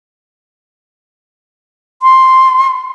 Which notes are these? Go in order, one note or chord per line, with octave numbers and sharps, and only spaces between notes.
C6